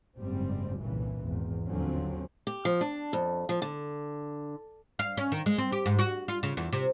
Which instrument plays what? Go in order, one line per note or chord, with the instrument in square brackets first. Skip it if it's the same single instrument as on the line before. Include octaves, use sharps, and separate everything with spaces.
[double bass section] F#1 G#2 G3 C4
G1 C2 A#2 C#3 E3
G#1 E2
D#2 D3 F3 F#3 C4 C#4
[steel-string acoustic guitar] G4
F3
D4
F2
F3
D3
[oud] F5
C#4
D#3
G#3
C4
G4
G#2
F#4
F4
C#3
E2
C3